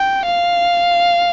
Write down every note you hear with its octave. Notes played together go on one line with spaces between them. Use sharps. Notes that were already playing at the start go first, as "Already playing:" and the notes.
Already playing: G5
F5